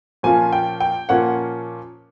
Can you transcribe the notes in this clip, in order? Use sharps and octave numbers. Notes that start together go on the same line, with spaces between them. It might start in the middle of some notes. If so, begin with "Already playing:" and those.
A#2 F3 A#3 C#4 F4 G#5
G5
G5
A#2 F3 A#3 C#4 F4 F#5